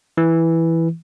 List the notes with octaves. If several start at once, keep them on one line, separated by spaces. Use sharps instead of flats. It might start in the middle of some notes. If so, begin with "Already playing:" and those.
E3